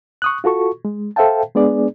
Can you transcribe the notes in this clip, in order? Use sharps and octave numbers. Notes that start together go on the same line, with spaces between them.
C#6 D#6 F#6
F4 F#4 A4 C#6
G#3
A4 C5 E5 F5 G5 A5
G#3 B3 D4 G#4 D5